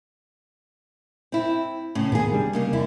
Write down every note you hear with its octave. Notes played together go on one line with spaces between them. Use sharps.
C4 E4
A2 C#3 C#4
A2 D#3 A#3 B3 G#4
C3 G3 D4
C#3 A#3 D#4
F1 D3 E4